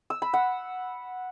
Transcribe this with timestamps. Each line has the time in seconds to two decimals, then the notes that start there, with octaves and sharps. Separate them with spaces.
0.10 E6
0.22 B5
0.34 F#5